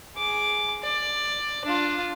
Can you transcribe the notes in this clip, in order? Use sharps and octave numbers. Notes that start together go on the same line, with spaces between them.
G#4 D6
D5
D4 F4